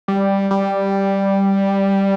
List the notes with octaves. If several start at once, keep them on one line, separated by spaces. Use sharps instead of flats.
G3
G3